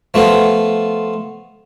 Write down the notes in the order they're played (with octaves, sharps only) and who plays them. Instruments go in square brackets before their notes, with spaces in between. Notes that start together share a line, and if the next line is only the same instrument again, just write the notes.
[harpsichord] F3 A3 B3 F4